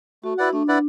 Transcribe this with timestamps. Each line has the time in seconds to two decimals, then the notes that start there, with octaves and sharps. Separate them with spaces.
0.24 A3 F#4
0.38 E4 B4 D5 F#5
0.53 A3 D4
0.68 E4 B4 D5 F#5